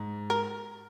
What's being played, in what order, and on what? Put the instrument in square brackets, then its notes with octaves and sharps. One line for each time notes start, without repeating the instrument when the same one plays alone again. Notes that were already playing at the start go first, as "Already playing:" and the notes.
Already playing: [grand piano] G#2
[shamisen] A#4